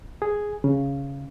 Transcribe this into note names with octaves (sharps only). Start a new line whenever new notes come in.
G#4
C#3